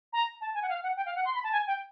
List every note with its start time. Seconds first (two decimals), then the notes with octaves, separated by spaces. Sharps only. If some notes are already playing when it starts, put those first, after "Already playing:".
0.13 A#5
0.41 A5
0.54 G#5
0.62 F#5
0.69 F5
0.83 F#5
0.97 G5
1.06 F5
1.16 F#5
1.25 C6
1.34 B5
1.44 A5
1.52 G#5
1.67 G5